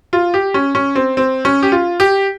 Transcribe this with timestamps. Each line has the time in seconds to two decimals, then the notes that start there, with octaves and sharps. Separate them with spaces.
0.13 F4
0.34 G4
0.54 C#4
0.75 C#4
0.96 C4
1.17 C4
1.45 C#4
1.63 G4
1.72 F4
2.00 G4